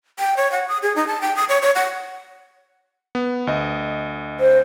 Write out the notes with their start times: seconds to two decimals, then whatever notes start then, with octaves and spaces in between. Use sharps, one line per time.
0.19 G5
0.37 C#5
0.52 F#5
0.68 D#6
0.83 G#4
0.96 D#4
1.07 A5
1.21 G5
1.36 D#6
1.49 C#5
1.62 C#5
1.75 F#5
3.15 B3
3.47 D2 D#5
4.40 C5